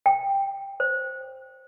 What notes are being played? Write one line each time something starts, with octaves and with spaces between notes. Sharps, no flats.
G5
C5